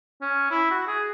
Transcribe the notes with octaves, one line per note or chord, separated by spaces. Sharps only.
C#4
E4
F#4
G#4